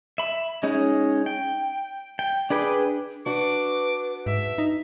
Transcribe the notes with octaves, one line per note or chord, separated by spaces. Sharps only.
E5 B5
G#3 C#4 D#4
G5
G5
D4 G#4 B4 G5
D4 F#4 B4 D6
G#2 E5
D#4